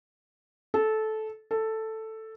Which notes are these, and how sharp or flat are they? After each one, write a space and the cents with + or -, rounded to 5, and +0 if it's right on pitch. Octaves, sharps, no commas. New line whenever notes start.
A4 -15
A4 +5